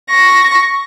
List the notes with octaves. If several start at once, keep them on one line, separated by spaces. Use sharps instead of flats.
C#6 A#6